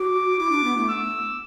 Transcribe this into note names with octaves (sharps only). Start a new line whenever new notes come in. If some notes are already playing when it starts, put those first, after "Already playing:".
Already playing: F#4 D6
E4 D6
D4
B3
A3
E6